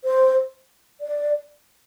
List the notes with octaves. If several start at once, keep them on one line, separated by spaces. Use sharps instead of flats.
C5
D5